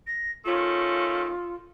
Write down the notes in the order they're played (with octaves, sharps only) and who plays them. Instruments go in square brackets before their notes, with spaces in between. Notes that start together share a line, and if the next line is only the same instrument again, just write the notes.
[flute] A#6
[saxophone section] D#3 A3 C#4 [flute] F4